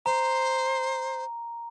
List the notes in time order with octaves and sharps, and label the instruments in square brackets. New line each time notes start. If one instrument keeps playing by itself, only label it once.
[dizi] C5 [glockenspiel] A#5